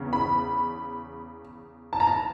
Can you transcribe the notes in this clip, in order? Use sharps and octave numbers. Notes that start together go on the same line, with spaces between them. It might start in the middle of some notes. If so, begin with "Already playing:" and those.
Already playing: E2 C#3
B5
A5
A#5
A5